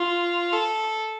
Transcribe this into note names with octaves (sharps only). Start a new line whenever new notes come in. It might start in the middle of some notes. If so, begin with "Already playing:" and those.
Already playing: F4
A4